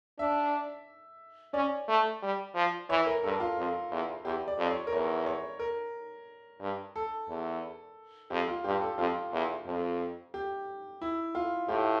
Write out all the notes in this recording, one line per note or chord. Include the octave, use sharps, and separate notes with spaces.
D4 E5
C#4 D5
A3
G3
F3
E3 C#5
A#4
G2 A4
F4
F2
E2
E2 G4
D5
F2
C#5
A#4
E2 C#5
C#5
A#4
G2
A4
E2
F2 G4
F4
G2 G4
A4
F2 F4
E2
F2
G4
E4
F4
A2 G4